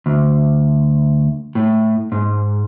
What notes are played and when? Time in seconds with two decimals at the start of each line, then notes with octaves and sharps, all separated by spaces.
0.06 D2
1.55 A2
2.12 G#2